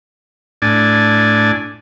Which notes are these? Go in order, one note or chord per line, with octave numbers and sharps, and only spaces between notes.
A2 D4 D5 G#5